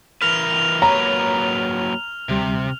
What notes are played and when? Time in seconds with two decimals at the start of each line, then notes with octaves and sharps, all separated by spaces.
0.22 E3 A#4 B4 F6 F7
0.82 F#3 A#3 B4 C#5 A#5
2.29 D2 C3 G3